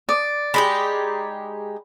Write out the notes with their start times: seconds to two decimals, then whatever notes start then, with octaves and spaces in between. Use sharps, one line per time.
0.09 D5 D#6
0.54 G#3 D#4 G4 B5